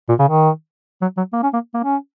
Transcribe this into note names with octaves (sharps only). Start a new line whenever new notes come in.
A#2
C#3
D#3
F#3
F#3
A#3
C#4
A#3
A#3
C#4